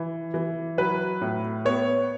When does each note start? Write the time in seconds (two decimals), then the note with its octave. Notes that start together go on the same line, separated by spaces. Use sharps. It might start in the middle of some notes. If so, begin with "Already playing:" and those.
Already playing: E3
0.34 E3
0.78 F#3 B4
1.21 A2
1.65 B3 C#5